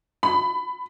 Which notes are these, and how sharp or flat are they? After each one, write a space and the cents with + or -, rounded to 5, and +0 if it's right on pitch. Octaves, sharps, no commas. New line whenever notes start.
B5 +20